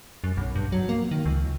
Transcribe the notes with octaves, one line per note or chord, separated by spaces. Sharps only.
F#2
B1
G2
F#3
A#3
D#3
C#2